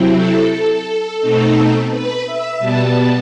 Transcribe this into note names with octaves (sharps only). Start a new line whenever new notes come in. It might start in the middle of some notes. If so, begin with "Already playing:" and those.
Already playing: C3 F#3 C4 E4
A4
A4
B2 A3 C4 D#4
B4
E5
B2 G3 B3 A5